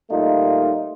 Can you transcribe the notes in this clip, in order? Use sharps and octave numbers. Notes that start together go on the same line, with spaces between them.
A#2 G3 A3 D#4 F4